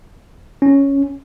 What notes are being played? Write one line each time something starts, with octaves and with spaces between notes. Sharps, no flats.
C#4